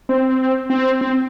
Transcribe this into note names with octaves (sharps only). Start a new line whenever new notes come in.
C4
C4
C4